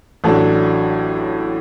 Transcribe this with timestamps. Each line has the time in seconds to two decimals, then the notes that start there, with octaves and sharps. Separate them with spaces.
0.24 A1 A2 F#3 D4 A4